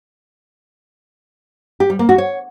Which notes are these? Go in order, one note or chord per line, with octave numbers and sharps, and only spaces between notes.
G4
G3
A#3
F#4
C#5